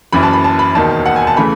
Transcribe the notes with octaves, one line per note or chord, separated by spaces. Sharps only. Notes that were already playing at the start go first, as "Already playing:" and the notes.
F#1 F#2 E3 B5
A5
B5
A5
B5
E1 D#2 D#3 A5
F#5
G#5
A5
C#3 E3 A3 B5